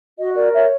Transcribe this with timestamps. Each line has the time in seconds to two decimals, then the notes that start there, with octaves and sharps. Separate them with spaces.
0.18 F#4 D#5
0.36 A#4 D5
0.53 C#5 E5